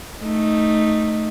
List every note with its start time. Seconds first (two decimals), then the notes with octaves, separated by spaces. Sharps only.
0.23 A3 D#4